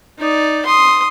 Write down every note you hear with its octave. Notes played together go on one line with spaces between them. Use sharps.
D#4 D5
C6 D#6